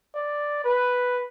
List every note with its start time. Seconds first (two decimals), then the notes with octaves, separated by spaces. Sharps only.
0.15 D5
0.64 B4